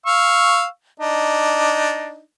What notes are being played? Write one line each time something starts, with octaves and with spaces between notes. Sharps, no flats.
F5 C#6 E6
D4 D#4